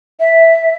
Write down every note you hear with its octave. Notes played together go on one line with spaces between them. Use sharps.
E5